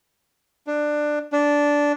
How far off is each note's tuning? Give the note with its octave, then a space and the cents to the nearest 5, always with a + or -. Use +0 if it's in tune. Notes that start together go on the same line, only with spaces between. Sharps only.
D4 +15
D4 -10